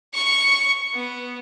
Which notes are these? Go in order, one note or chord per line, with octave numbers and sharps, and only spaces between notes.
C#6 C#7
B3